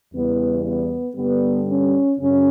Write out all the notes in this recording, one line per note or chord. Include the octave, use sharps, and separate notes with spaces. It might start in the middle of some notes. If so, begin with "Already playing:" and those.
E2 C#3 E3 G3 B3
B3
G2 D3 G3 B3
C#4
F#2 C#3 C#4